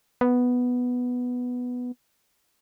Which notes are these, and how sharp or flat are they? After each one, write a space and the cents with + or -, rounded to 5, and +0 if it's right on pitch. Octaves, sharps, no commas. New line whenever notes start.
B3 +0